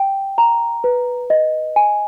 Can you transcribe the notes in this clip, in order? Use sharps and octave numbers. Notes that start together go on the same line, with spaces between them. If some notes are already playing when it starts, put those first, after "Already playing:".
Already playing: G5
A#5
B4
D#5
G#5